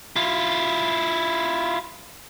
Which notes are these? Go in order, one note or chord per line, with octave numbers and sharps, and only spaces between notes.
E4 F4